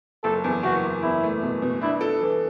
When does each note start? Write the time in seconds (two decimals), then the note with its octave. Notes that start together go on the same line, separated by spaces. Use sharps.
0.23 F#1 A4
0.44 E2
0.63 F#1 F#4
0.83 F#1
1.02 E2 E4
1.23 A3
1.42 B2
1.62 B2
1.81 D4 E4
2.01 A4
2.21 E3